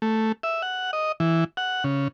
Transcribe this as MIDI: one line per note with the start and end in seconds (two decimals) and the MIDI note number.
0.02 0.32 57
0.43 0.62 76
0.62 0.91 78
0.93 1.12 75
1.20 1.44 52
1.57 1.84 78
1.84 2.08 49